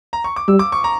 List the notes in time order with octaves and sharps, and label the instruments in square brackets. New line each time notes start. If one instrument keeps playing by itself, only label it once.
[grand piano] A#5
C#6
D6
[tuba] G3 [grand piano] E6
[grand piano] D6
C#6
A#5